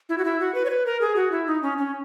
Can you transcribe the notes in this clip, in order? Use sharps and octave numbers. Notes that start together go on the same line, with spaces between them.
E4
F#4
E4
F#4
B4
C#5
B4
A#4
G#4
F#4
E4
D#4
C#4
C#4